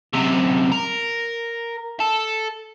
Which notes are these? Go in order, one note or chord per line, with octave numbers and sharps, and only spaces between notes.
F#2 C3
A#4
A4